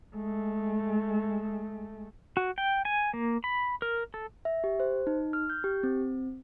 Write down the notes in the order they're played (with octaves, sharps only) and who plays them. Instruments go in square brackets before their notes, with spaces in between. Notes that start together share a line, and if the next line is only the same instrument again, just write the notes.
[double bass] G#3 A3
[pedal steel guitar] F#4
G5
G#5
A#3
B5
A#4
A4
[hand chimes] E5
G4
C5
D#4
F6
G6
G4
C4